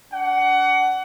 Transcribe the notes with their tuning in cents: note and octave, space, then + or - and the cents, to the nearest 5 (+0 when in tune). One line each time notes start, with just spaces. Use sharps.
D4 -35 F#5 +20